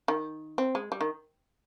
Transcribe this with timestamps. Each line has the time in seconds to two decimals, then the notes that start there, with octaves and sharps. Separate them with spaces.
0.08 D#3
0.58 C4
0.75 G#3
0.92 G3
1.01 D#3